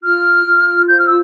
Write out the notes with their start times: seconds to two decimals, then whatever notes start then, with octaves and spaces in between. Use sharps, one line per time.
0.03 F4 F6
0.46 F4
0.88 C5 G6
0.98 F6
1.07 E6